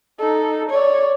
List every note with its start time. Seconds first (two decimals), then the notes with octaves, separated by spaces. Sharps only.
0.20 D#4 A4
0.70 C#5 D5